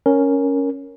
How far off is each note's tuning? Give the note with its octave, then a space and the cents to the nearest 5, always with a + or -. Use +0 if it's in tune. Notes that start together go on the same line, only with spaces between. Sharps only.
C#4 +0 A#4 +0